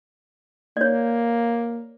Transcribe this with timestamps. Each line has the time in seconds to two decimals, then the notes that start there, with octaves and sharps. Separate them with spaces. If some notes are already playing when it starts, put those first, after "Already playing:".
0.77 A#3 C#5 D5